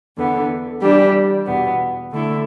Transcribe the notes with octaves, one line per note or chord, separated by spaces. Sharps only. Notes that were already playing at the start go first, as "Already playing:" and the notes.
E2 D3 B3
E3 G3 D4 G4
E2 B2 B3
D3 A3 E4 A4